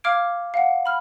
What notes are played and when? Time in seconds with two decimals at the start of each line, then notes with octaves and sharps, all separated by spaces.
0.04 F5 D6 F6 G#6 D7
0.54 F5 F#5
0.86 B5 F6